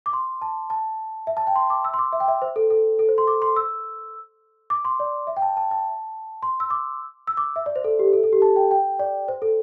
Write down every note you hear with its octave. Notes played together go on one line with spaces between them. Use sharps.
D6
C6
A5
A5
E5
A5
G5
C6
D6
E6
C6
D6
E5
G5
E5
C5
A4
A4
A4
C5
C6
D6
C6
E6
D6
C6
D5
E5
G5
A5
A5
A5
C6
E6
D6
E6
D6
E5
D5
C5
A4
G4
A4
A4
G4
A5
G5
G5
D5
C5
A4